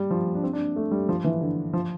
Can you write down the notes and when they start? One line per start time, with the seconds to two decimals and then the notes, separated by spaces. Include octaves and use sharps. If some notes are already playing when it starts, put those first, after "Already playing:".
Already playing: G3
0.11 F3
0.35 D4
0.43 C4
0.53 D4
0.76 A3
0.91 G3
1.09 F3
1.24 E3
1.41 D3
1.73 F3